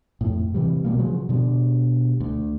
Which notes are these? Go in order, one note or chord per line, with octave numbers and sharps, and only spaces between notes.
F2 A2
C3 E3 G3
B2 G3 A#3
C#3 F3 F#3
B2 D3 G3
D2